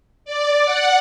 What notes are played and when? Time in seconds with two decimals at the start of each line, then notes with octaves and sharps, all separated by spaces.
0.25 D5
0.65 F#5